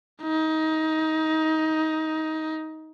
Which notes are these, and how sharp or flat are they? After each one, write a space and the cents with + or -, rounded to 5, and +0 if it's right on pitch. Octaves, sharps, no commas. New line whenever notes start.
D#4 +20